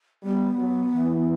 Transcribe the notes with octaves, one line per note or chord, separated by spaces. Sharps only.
G3 B3
F#3
E3